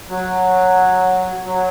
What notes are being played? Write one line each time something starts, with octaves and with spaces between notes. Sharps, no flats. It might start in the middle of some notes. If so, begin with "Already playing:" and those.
F#3
F#3